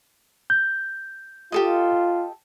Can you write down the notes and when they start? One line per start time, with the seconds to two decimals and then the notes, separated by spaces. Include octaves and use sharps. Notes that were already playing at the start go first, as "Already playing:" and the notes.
0.50 G6
1.52 F4 G4 A4 D#5